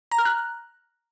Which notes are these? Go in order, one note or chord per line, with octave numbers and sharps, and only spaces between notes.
A#5
F6
F#6